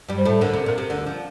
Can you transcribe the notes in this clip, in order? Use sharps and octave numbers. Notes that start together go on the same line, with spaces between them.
G2 G3
C5
A2 A3
D2 D3 A#4
C3 A4
A#2 A#4
C3
D2 D3
F3